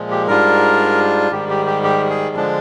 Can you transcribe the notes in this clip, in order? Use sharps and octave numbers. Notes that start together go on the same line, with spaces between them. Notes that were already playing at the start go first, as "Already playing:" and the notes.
Already playing: A#2 F3 G#3
G4
G#2 G3 D4 F4 A#4
G#2 D#3 G3 G4
G4
G4
G4
G#4
D3 F3 G#3 D4